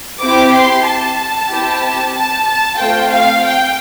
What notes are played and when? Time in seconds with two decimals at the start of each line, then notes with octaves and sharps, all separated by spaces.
0.20 C4 E4 G4 D6
0.53 C6
0.84 A5
1.17 A5
1.49 C4 E4 G4
2.13 A5
2.46 A5
2.77 A3 C4 F4 G5
3.10 F5
3.42 G5